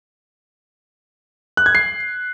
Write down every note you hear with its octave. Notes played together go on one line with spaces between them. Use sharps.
F#6
G#6
C7